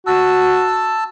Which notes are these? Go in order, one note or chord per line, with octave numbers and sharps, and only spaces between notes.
F#4 A5 E6